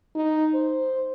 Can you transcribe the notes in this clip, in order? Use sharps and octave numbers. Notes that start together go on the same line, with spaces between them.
D#4
C5